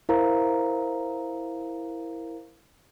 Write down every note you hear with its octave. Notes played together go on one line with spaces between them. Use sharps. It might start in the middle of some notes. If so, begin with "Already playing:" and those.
E4 A#4 C5 F5 A#5